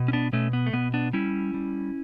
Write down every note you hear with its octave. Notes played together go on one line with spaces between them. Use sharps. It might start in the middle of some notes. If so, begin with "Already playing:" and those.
Already playing: B2
C#4
B3 D4
B2 A3 C#4
B3
A3
B2 B3
B3 D4
G3 C#4 E4
G3